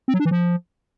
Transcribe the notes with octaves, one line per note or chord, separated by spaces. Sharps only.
C4
F#3
D4
E3
F3